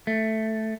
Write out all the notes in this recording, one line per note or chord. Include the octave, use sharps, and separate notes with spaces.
A3